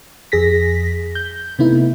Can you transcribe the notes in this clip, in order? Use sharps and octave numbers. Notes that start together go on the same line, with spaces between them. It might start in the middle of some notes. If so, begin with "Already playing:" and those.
F2 G#4 A#6 B6
G6
C3 A3 B3 D#4 E4